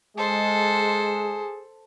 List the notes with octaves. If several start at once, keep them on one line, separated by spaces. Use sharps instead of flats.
G#3 G#4 A4 C5